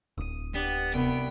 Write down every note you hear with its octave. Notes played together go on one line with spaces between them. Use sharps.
D1 D#6 D#7
B3 D4 G4
C2 B3 G5